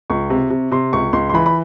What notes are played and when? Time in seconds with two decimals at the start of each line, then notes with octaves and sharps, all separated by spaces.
0.10 C#2 C#6
0.30 C3
0.50 C3
0.72 C3 C6
0.93 C#2 C#6
1.13 C#2 C6
1.30 C6
1.34 E3 B5
1.46 B5